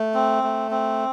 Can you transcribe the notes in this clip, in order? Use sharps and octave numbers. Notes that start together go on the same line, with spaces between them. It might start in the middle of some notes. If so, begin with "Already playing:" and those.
Already playing: A3
C4
A3
C4